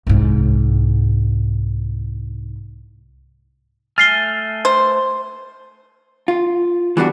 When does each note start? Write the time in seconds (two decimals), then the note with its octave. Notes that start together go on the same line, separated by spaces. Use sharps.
0.07 C2 G#2
3.98 A3 G#5 F6 A6 C7 G7
4.65 C5
6.28 F4
6.97 E3 G3 B3 D4 F#4